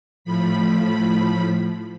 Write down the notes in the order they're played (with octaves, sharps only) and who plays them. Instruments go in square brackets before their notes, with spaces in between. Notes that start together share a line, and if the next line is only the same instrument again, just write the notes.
[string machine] A2 F3 B5